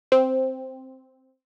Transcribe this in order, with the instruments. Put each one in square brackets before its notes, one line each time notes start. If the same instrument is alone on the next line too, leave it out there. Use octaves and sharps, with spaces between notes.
[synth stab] C4